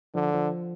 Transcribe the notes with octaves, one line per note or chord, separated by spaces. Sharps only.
D3 F3
F3